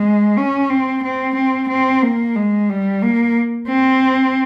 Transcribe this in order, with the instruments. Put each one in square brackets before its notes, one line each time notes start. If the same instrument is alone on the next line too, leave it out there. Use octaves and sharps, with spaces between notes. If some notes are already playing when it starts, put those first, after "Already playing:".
Already playing: [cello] G#3
C#4
C4
C4
C4
C4
A#3
G#3
G3
A#3
C4